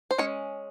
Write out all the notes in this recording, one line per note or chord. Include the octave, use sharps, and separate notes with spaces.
C5
G#3 C#4 C#5